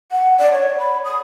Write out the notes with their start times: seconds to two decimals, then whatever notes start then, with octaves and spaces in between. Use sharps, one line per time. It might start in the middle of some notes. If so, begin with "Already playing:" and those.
0.11 F#5
0.39 D5
0.52 C#5
0.78 B5
1.04 D#6